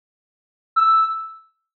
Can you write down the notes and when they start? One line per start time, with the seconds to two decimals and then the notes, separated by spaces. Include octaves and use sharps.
0.76 E6